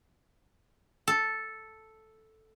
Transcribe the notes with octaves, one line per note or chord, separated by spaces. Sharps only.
A4